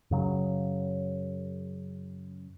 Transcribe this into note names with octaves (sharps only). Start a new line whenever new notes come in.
F#2 C#3 F#3